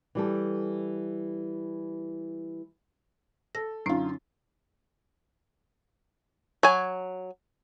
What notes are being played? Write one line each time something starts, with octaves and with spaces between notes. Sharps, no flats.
E3 G3 A4
A4 A#6
F#2 D3 C#4 D#4 F4
F#3 G#5